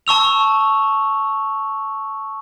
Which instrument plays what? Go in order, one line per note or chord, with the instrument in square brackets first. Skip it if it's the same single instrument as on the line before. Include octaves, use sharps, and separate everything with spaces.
[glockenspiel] A5 C#6 E6 F7